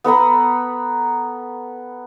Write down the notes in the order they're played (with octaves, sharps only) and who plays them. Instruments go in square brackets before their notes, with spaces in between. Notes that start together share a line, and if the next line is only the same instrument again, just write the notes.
[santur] B3 A4 A#5 B5